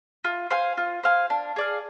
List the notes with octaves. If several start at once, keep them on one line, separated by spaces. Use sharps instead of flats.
F4
C5 F5 G#5
F4
C5 F5 G#5
D4
G#4 D5 F5